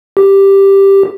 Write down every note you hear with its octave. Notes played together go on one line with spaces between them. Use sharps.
G4